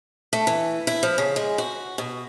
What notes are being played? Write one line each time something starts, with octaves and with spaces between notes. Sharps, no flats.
A3
E3
E4
F3
C#3
G#3
F#4
B2